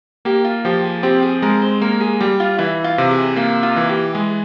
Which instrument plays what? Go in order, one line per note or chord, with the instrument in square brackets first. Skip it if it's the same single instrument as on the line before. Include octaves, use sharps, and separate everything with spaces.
[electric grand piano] A#3 [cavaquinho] G4
[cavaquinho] F4
[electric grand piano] F3 [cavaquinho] G4
[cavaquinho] G#4
[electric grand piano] C4 [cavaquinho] G4
[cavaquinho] G#4
[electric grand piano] G#3 [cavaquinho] A#4
[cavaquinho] C5
[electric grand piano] A#3 [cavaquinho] A#4
[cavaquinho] G#4
[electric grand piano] G3 [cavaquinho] G4
[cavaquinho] F4
[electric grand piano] E3 [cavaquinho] E4
[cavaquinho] F4
[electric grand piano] C3
[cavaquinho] G#4
[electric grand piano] A#3 [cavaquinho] F4
[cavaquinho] F4
[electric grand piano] E3
[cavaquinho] G4
[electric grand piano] G#3 [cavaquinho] G#4